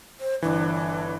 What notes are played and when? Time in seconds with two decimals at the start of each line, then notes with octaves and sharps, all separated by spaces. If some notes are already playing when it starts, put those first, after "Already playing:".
0.20 C5
0.42 G1 E3 D4